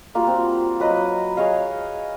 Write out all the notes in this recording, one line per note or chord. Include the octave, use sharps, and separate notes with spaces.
G3 A#3 F4 F#4
C4
F#3 B4 D#5
G#4 C#5 D#5 F5